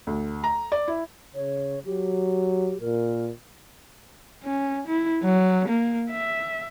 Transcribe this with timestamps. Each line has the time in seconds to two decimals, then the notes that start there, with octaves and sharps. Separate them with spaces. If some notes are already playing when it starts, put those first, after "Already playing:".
0.07 D2
0.44 A#5
0.72 D5
0.88 E4
1.35 C#3 C#5
1.86 F#3 G4
2.81 A#2 A#4
4.44 C#4
4.88 E4
5.24 F#3
5.68 A#3
6.10 E5